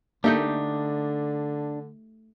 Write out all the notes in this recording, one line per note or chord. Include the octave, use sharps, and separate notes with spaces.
D3 A3 A#3 D4 D#4 G4 E5 G6